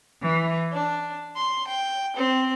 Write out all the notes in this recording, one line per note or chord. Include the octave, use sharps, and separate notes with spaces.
E3
D4
C6
G5
C4